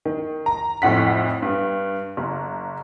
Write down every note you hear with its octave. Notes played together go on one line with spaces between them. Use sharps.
D#3
A#5
G#1 F2 A2 F#5 B6
G2
F#1